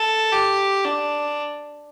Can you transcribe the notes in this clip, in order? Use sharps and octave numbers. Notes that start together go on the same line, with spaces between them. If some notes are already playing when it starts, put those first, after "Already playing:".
Already playing: A4
G4
D4